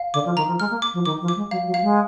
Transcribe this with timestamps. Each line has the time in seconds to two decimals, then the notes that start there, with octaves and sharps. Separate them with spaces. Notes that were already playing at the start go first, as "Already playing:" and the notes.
Already playing: F5
0.14 D3 D6
0.25 F3
0.37 D#3 A#5
0.48 F3
0.59 G#3 F6
0.71 A#3
0.82 D6
0.94 F3
1.05 D#3 D6
1.21 F3
1.28 D6
1.36 G#3
1.51 F#3 F5
1.67 F#3
1.74 F5
1.82 G#3